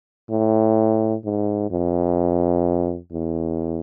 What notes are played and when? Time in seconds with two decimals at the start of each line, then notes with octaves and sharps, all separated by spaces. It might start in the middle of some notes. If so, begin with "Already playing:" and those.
0.31 A2
1.25 G#2
1.71 F2
3.12 E2